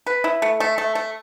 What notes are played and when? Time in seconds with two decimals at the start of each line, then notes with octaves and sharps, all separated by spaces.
0.07 B4
0.24 E4
0.42 A3
0.60 A3
0.78 A3
0.95 A3